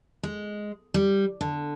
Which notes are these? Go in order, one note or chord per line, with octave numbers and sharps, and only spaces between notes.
G#3
G3
D3